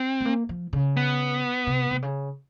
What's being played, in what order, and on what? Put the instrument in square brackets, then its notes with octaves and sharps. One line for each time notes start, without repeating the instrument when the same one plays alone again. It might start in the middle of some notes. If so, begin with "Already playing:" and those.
Already playing: [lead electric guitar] C4
[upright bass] A3
A#3
F3
C#3
[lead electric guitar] B3
[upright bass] C3
C3
C#3